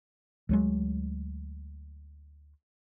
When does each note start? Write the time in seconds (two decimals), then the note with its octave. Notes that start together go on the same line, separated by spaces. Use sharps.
0.49 D2 F#3 G#3